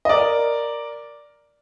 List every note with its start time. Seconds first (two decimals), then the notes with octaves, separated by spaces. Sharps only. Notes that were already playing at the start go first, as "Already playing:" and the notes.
0.05 D#5
0.09 A#4 D5